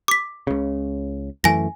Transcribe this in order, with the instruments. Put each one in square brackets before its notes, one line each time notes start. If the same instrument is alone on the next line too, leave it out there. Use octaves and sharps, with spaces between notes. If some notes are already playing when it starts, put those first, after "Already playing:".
[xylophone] D6 B6
[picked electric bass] C#2 C#3
[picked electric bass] F#2 E3 A3 [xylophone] G#5 A#6